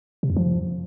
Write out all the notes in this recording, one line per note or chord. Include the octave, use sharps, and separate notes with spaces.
C3
F2
F3